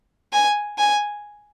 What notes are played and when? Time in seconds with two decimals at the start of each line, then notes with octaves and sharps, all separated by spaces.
0.33 G#5
0.78 G#5